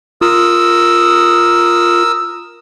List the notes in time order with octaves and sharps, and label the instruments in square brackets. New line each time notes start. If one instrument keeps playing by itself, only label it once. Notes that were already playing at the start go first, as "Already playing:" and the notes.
[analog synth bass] F4 [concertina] A#4 D#6 E6